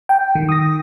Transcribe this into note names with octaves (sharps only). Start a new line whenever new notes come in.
G5
D#3
D#6 A#6